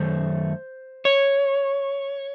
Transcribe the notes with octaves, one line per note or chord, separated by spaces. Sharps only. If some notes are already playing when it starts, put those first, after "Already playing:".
Already playing: F#2 D#3 A3 C5
C#5